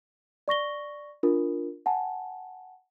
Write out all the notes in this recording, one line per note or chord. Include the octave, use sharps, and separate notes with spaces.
D5 C#6 A#6 G7
D4 F4 A#4
F#5 G#5 A5